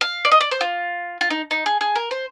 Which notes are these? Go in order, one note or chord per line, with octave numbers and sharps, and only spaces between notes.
F5
D5
D#5
D5
C5
F4
F4
D#4
D#4
G#4
G#4
A#4
C5